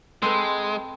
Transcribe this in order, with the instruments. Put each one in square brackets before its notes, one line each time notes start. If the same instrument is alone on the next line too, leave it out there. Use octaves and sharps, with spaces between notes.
[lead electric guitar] G#3 [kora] C4 A4 B4